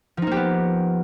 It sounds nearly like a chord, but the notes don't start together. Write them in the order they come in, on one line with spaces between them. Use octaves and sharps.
F3 D#4 A#3 G4 B3